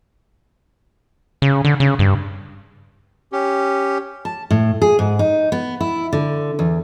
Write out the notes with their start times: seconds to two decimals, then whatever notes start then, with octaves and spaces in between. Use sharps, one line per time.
1.42 C#3
1.65 D3
1.80 C#3
1.99 G2
3.32 C#4 G4
4.25 A5
4.51 A2
4.82 G#4
4.99 G#2
5.19 D#4
5.52 B3
5.81 E4
6.13 D3
6.59 E2